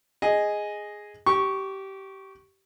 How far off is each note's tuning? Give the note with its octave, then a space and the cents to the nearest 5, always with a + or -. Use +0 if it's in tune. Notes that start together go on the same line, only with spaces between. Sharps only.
G#4 +0 D#5 +0
G4 -20 C#6 +0